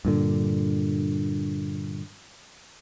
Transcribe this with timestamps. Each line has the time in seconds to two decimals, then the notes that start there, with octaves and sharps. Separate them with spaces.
0.05 G2 A#2 D3